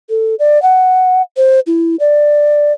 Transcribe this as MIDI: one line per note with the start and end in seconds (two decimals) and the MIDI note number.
0.10 0.35 69
0.39 0.61 74
0.62 1.22 78
1.37 1.60 72
1.67 1.96 64
2.00 2.72 74